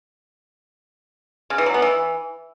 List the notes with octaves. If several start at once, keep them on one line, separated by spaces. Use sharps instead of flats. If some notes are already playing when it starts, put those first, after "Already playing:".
C#3
E3
F#3
B3
E3